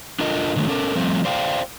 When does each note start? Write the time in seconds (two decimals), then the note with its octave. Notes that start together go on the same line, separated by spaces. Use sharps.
0.19 D4 F4 A4 A#4 D#5
0.56 D3 D#3 F#3 A3
0.68 C#4 A4 A#4
0.96 F3 G3 A3 C4
1.25 C5 D5 F5 G5